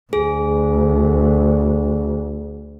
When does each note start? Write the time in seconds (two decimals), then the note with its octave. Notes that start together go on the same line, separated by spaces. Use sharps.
0.13 D2 G#4